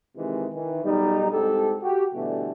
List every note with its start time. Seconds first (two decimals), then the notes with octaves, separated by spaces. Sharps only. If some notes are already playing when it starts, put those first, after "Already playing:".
0.17 C3 D#3 E3 G#3
0.53 D#3 E3
0.84 B1 G3 D#4
1.32 C2 G#2 G4 A4
1.82 F#4 G4
2.14 B2 D3 E3 G3 A3